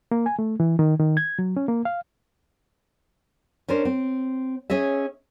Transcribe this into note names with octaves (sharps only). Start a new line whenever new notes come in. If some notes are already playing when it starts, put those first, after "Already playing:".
A#3
G#5
A3
E3
D#3
D#3
G#6
F#3
C#4
A#3
F5
C#4 D4 A#4 C5
C4
C#4 G#4 D#5 E5